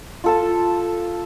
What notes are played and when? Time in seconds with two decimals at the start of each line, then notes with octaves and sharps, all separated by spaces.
0.24 F4 A4 A5